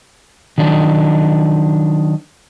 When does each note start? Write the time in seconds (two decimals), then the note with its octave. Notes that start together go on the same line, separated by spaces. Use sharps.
0.58 D#3 F#3 D4 D#4